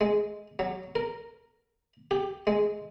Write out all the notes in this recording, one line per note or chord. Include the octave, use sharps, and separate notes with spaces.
G#3
F#3
A#4
G4
G#3